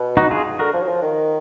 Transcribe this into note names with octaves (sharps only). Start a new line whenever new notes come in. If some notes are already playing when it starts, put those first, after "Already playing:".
Already playing: B2
D#4 F#4
F4 G#4
D3 F#4 A#4
F3
F#3
F3
D#3